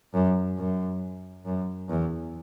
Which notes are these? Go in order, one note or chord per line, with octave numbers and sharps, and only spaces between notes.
F#2
F#2
F#2
E2